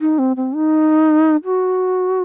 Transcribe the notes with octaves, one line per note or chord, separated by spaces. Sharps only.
D#4
C4
C4
D#4
F#4